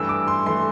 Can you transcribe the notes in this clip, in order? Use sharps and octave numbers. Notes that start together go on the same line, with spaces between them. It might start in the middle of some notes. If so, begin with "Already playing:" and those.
Already playing: G2 E3 A3 E6
D6
C6
E3 A3 C6